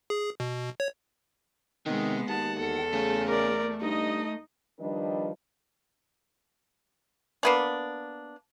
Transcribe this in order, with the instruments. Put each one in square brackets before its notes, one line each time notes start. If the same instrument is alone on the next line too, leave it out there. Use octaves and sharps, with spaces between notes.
[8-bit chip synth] G#4
B2
C#5
[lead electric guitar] C3 [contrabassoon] D#3 [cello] G#3 B3
[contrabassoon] D#2 [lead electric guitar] F#5 [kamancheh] A5
[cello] E2 [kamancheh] A4
[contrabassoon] C#3 [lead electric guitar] A3
[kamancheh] A#4 D5
[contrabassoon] G2 [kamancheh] D#4 D#5
[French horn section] D#3 F3 G3 D4 B4 D#5
[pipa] A#3 B3 D4